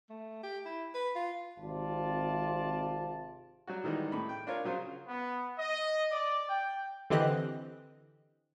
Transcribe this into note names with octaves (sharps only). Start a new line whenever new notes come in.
A3
G4
E4
B4
F4
G#1 C3 F4 D5 A5
F#3 G3 F#4
D#3 E3 G3 G#3 D#4
A2 B5
G5
D4 F4 A#4 C#5
C#3 F#3 F4 C5
B3
D#5
D5
G5
D3 E3 C4 G4 D#5 F#6